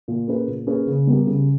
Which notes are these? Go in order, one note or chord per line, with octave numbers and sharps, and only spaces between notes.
A#2
A#3 C#4 G#4 B4
A#2
A#3 C#4 G#4 B4
C#3
G3 B3 G4 A#4
C#3